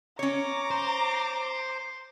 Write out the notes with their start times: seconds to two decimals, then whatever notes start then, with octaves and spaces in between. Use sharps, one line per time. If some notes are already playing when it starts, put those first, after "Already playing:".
0.19 C#4 C#5 A#5 D6
0.71 C5